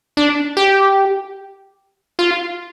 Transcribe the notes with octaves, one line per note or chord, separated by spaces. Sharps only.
D4
G4
F4